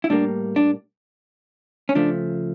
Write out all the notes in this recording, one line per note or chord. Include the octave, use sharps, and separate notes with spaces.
E4
A2 G3 A#3 D4
D4
C#4
C#3 F3 A3 D4